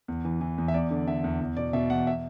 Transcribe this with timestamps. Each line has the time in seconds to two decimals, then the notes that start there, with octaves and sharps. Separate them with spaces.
0.08 E2
0.25 E3
0.41 E3
0.58 E2
0.68 E5
0.74 E2 D5
0.91 D3
1.07 D3 E5
1.24 E2
1.41 E2
1.57 B2 D5
1.73 B2 E5
1.90 E2 F#5
2.07 E5